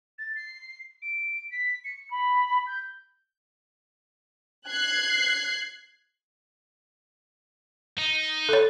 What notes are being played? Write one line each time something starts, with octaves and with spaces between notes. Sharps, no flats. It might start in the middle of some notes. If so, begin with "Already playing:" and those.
A6
C7
D7
B6
C#7
B5
G6
F#6 G#6 C7
D#4
A4 C#5